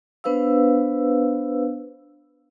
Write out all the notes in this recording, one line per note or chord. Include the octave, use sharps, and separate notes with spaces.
B3 D4 B4 C5 F5 E6